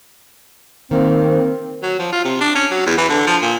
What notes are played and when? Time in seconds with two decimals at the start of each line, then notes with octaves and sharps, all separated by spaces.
0.91 D#3 A#3 C4
1.83 F#3
1.99 F3
2.13 F4
2.25 C3
2.41 D4
2.55 C#4
2.71 F#3
2.86 E2
2.98 E3
3.09 D3
3.27 F3
3.42 A#2